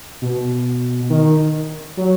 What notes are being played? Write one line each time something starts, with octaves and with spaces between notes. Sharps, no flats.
B2
D#3
F#3